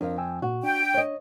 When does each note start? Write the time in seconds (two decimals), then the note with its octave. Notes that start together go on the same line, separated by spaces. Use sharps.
0.01 F2 D4 A#4 F5
0.18 G5 G#5 E6
0.42 A#2 F#4
0.63 D4 G5
0.94 C#5 D#5